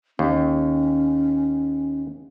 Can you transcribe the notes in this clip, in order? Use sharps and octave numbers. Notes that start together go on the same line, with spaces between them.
D#2 C#4